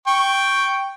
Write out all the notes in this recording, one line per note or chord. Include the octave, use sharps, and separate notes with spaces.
G5 C#6